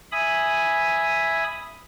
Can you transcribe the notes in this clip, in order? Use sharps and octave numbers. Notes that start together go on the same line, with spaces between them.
E5 G#5 B5 D#6